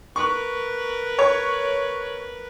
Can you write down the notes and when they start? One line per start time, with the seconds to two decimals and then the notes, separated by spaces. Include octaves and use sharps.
0.16 A#4 B4 C#6
1.19 C#5